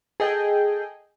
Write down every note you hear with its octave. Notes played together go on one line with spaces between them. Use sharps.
G#4 A4 D#5 G5